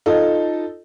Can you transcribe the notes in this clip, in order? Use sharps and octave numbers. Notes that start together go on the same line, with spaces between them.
D#4 F4 A4